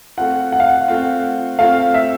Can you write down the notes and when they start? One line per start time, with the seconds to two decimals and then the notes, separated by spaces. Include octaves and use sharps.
0.17 A3 C4 F4 F#5
0.52 F#5
0.60 F5
0.68 F#5
0.88 A3 C4 F4
1.59 A3 C4 F4 F5
1.94 E5